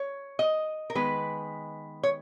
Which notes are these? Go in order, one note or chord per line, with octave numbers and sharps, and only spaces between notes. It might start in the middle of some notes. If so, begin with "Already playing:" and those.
Already playing: C#5
D#5
A#4
D#3 G#3 B3 B4
C#5